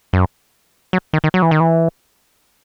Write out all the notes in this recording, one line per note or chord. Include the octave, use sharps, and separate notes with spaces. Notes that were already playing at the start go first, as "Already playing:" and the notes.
F#2
F#3
D#3
D#3
F#3
E3
D#3
E3